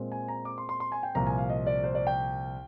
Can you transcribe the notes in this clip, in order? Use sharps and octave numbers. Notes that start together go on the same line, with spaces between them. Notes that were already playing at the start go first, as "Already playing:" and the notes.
Already playing: A#2 G#3 C4
G#5
A#5
D6
C6
C6
C6
G#5
G5
C2 A#2 F3 A#5
G#5
F5
D#5
D5
C5
D5
G5